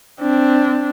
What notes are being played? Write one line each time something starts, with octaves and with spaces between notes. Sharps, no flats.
C4 D4